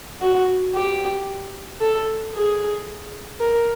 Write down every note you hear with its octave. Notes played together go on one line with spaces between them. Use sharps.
F#4
G4
A4
G#4
A#4